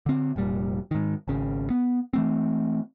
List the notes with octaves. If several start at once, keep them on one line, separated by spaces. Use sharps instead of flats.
D3 C4
F1 A#2 G3
G#2 D#3
G#1 C#3
B3
E3 A3 C4